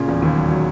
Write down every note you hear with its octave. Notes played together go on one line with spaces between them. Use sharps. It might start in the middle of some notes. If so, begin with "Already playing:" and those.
Already playing: A#2 C#3
E1
D#2
F#3
F#3